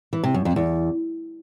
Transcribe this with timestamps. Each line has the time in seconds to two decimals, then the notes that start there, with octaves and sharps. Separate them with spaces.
0.13 E3
0.24 C3
0.34 F#2
0.45 F2
0.56 E2